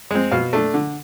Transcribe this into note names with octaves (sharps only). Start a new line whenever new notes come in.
G#3 C4
B2 F5
A3 D4
D3